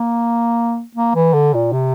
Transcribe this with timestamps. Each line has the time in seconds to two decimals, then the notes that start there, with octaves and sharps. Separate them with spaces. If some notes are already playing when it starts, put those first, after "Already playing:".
Already playing: A#3
0.95 A#3
1.15 E3
1.33 D3
1.54 A#2
1.73 C3